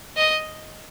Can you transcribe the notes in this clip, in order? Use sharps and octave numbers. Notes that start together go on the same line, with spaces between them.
D#5